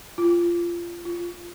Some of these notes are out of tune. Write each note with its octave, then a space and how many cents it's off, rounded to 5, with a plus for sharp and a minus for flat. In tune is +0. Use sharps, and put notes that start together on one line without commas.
F4 -20
F4 +0